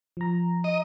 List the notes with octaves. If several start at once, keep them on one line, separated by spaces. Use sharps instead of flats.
F3 A#5
D#5